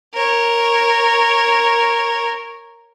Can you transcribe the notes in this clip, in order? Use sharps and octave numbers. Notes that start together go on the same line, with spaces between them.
A#4 C#5